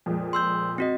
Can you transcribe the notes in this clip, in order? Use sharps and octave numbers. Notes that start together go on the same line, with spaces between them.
F2 A#2 G#3
C6 E6 G6
C4 F#4 D#5